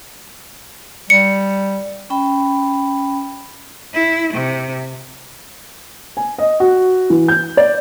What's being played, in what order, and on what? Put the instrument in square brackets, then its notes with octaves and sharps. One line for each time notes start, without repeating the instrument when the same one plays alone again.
[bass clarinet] G3 [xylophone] C#7
[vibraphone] C#4 G5 B5
[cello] E4
C3
[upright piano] G#5
D#5
F#4
E3
G6
D5